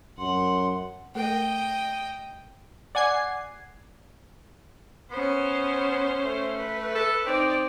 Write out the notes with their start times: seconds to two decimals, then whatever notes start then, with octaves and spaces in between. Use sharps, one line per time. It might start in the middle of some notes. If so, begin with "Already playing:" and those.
0.18 F#2 F#5 C6
1.15 A3 A4 A#4 D#5 G5
2.95 D5 F#5 G#5 G#6 C7
5.11 B3 C#4 C5
6.25 A3
6.57 B4
6.95 A4
7.26 C4 D#4 D5